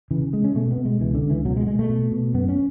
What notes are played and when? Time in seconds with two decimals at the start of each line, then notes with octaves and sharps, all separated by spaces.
0.11 C#3 E3
0.33 C#3 G#3
0.44 C#4
0.55 B2 A3
0.71 B3
0.77 B2
0.85 G#3
1.00 C#2 E3
1.15 D3
1.22 C#2
1.30 E3
1.45 B2 F#3
1.57 G#3
1.67 B2 G#3
1.79 A3
1.89 B2
2.12 B2
2.34 F#2 B3
2.49 C#4